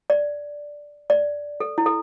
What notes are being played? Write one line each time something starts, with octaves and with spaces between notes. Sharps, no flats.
D5
D5
A4
E4
A4